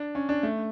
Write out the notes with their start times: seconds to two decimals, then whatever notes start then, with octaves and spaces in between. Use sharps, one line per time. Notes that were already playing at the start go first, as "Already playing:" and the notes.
Already playing: D4
0.15 C#4
0.29 D4
0.43 A3